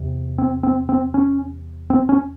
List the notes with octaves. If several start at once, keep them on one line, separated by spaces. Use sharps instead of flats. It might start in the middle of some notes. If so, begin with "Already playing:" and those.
Already playing: E2 C3
C4
C4
C4
C#4
C4
C#4